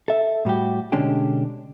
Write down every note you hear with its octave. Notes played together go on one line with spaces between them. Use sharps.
A4 E5
A2 G3 F#4 G4
B2 D3 G#3 C#4 D4 G4